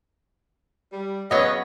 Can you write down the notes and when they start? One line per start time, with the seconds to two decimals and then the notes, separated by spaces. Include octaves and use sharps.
0.91 G3
1.31 C#3 F#3 B3 C#4 C#5 D#5